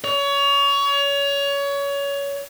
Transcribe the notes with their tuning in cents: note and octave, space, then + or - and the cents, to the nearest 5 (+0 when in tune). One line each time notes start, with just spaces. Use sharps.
C#5 +25